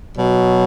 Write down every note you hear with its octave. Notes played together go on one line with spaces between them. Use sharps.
B2 F#3